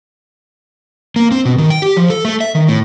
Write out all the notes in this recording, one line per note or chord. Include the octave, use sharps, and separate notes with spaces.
A#3
C4
B2
D#3
G5
G4
F3
A4
A3
E5
D#3
A2